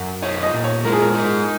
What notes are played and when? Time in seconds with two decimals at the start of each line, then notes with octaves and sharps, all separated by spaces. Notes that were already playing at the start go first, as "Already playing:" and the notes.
Already playing: F#2
0.22 D#4 C#5
0.43 D#5
0.54 A#2
0.64 C#5
0.85 G#3 A#4
0.93 G#4
1.01 A#4
1.15 D#4